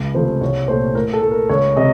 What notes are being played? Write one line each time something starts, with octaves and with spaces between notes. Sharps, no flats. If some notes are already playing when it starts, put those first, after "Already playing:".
Already playing: C#2
C3 F3 A3 C5
C2 C#5
A#2 A3 C5
A2 A#4
A4
A3
A#4
C#2 C#5
C3 D#5